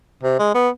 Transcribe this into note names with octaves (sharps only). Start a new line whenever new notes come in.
C3
G#3
B3